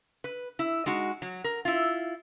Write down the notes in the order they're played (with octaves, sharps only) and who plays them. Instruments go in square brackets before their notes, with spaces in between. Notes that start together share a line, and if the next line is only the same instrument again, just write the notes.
[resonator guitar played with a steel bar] B4
E4
G#3 D#4 F#4
F#3
A#4
E4 F4